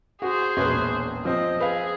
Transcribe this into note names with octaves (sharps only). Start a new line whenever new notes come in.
F#4 G#4 C5
E1 A#1 C#4 B4
F3 C4 D#5
G#4 B4 F5